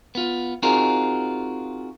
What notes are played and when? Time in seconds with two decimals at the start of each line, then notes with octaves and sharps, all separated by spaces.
0.15 B3 F4
0.63 C4 D#4 F4 F#4 G#4 A#4